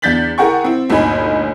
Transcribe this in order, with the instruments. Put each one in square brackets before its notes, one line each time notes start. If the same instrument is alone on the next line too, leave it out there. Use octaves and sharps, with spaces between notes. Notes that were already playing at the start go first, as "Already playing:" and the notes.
[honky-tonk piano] E2 D4 G6 A6 B6 F#7
E4 G#4 A#4 F#5 G5 C#6
C4 E4
G1 D2 A#2 D#4 G#5 B5